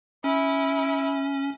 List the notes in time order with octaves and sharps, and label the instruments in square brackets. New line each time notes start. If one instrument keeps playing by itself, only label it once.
[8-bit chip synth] C#4 [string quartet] E4